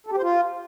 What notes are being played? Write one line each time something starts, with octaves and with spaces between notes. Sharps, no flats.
A4
G4
C5
F4